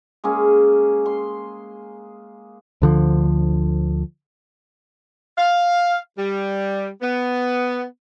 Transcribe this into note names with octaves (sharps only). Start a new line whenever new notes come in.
G#3 A#3 C#4 G#4
C6
D2 D3 F3
F5
G3
B3